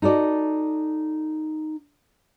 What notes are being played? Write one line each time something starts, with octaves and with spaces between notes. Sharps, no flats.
D#4 F#4 A4 D5